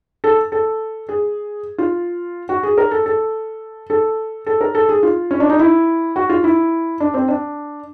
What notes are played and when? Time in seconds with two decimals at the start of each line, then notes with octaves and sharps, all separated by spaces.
0.24 A4
0.52 A4
1.09 G#4
1.78 F4
2.49 F#4
2.63 G#4
2.78 A#4
2.91 A4
3.06 A4
3.90 A4
4.47 A4
4.61 A#4
4.75 A4
4.89 G#4
5.03 F4
5.31 C#4
5.40 D4
5.49 D#4
5.59 E4
6.16 F#4
6.29 F4
6.44 E4
7.00 D4
7.14 C4
7.28 D4